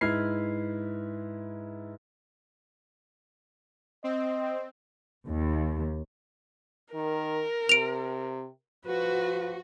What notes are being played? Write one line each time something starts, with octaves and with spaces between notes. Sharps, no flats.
G#2 E4 B4 F6 G#6 C7
C4 D#5
D#2
D#3 A#4
C3 D7 F7
F3 F#4 B4